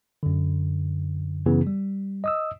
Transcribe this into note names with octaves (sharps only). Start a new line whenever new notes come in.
F#2 D3
F#2 C#3 E3 B3 G#4
G3
D#5 D#6 E6